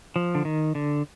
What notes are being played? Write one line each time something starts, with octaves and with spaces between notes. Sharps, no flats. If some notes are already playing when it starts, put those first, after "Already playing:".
F3
D3
D#3
D3